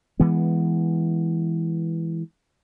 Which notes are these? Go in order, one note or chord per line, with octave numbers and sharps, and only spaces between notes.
E3 G#3 B3